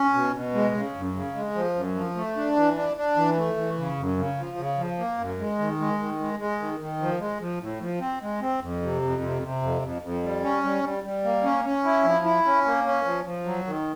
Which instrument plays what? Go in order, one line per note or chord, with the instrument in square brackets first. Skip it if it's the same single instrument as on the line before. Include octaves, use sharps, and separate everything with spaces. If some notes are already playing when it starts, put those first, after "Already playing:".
Already playing: [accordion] C#4
B2
B2
G#3
C#3
F#2
C#3
G#3
F3
F#2
F3
A3
D4
E3
D4
D4
E3
A3
E3
C#3
F#2
C#3
F3
C#3
F3
A#3
F#2
G#3
D#3
G#3
D#3
G#3
G#3
D#3
D#3
F3
G#3
F3
A2
F3
C4
G#3
C4
F2
C3
F2
C3
C3
F2
F2
F2
G3
C#4
G3
G3
G3
A#3
C#4
C#4
E4
F3
E4
C#4
A#3
C#4
F3
F3
F#3
D#3